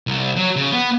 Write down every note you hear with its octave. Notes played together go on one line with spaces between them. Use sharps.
C2
F#3
C#3
B3